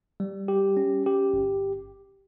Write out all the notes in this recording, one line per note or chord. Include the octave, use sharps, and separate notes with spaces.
G3
G4
C#4
G4
G1